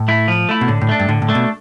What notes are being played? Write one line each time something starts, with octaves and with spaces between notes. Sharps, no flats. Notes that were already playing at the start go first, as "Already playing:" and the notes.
Already playing: A2
A3 E4
F3
A3 E4
B2
A2 D3
A2
A3 D4
G2
A2 D3
A2
A3 D4
B2